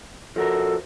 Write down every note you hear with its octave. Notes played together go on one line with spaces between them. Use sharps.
F3 F#4 A4 A#4